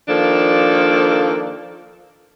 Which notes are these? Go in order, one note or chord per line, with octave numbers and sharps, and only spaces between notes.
D#3 F3 A#3 D4 A4